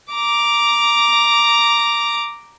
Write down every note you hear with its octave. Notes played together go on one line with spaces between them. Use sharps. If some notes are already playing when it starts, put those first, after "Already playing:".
A#5 D6